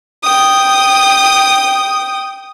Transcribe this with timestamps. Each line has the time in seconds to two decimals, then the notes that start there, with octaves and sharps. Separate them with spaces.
0.23 G5 D#6